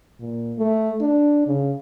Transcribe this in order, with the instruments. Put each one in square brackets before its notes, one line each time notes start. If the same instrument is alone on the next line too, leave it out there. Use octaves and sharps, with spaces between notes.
[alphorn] A#2
A3
D4
C#3